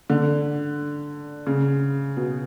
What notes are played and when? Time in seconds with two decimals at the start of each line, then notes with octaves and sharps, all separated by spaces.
0.10 D3
1.47 C#3
2.17 B2